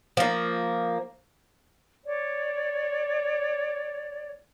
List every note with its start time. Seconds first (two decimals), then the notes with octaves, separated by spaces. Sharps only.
0.17 F3 A#3
2.05 C#5 D5